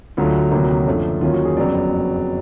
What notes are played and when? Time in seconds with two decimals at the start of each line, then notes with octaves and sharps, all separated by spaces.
0.17 D2 D3 F#3 A3 F4
0.52 D2 C3 D#3 F#3 A#3
0.87 F#2 D3 F3 A3 C#4
1.21 D#2 D#3 F#3 A#3 C#4 F4
1.33 F#4
1.45 G#4
1.56 F#1 F2 C#3 F#3 B3 D5